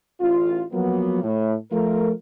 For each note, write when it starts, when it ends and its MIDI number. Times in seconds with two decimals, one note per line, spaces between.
0.21 0.63 33
0.21 0.63 65
0.72 1.20 53
0.72 1.20 54
0.72 1.20 58
0.72 1.20 59
1.23 1.54 45
1.72 2.11 53
1.72 2.11 57
1.72 2.11 65
1.72 2.11 70